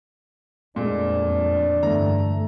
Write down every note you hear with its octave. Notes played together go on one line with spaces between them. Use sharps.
F2 A#2 G#3 A3 D4
G2 D3 E3 A3 B3 A#5